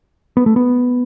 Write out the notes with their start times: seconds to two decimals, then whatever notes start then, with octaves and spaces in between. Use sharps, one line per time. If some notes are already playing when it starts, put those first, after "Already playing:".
0.37 B3
0.46 A3
0.56 B3